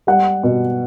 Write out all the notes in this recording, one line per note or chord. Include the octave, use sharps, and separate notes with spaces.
G3 F#5
B2